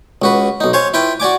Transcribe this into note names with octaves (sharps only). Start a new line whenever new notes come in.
C#2 F#4 B4
B1 D#4
C5 C#5 F5 G#5
E4 F4 B4 G5
F#4 D5 G#5 D6